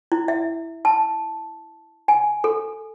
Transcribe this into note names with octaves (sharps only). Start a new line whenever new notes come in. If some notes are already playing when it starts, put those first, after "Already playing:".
E4
E5
A5
G#5
A4